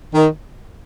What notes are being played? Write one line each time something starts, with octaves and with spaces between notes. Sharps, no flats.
D#3